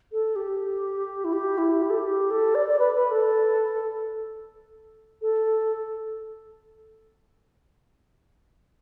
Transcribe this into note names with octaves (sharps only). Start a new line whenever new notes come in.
A4
G4
E4
G4
E4
G4
A4
G4
A4
D5
D5
B4
B4
A4
A4